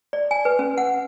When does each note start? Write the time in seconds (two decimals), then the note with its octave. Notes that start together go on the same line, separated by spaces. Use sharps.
0.13 D5
0.31 G#5
0.45 B4
0.59 C#4
0.78 F#5